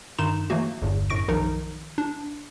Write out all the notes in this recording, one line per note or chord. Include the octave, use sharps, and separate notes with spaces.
G2 D#3 D#4 C6 E7
E3 F#3 A3 A#3 F#4
G1 E2 G2
F#2 A2 C#6 A#6 D7
B1 D#3 F3 D#4 A#4
D4